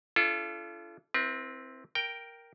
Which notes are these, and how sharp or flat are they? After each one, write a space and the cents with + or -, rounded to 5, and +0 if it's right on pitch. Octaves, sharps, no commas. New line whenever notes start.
D4 -20 F4 -40 A4 -20
C4 +0 E4 +0 B4 -40
A#4 +0 G5 +0